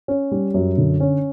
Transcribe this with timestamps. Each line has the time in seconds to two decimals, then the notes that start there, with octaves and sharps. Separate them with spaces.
0.08 C#4
0.32 G3
0.54 F#2
0.78 D3
1.00 C#4